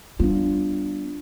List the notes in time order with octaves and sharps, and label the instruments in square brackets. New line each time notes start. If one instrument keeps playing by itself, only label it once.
[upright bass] G3 B3 [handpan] D4 F4